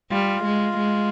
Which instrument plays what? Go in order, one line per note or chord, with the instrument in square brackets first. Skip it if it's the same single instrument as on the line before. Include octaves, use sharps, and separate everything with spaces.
[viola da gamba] G3 [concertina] F4
[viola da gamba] G#3
G#3